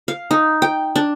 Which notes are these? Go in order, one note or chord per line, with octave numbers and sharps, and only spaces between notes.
F5
D#4
G5
D4